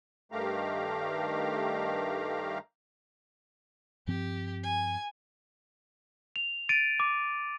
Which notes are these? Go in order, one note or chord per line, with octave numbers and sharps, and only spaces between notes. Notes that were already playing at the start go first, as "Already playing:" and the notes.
G2 D#3 A3 G4 F5 A#5
G2 F3 C4 G4
G#5
F7
A6 D7 D#7
D6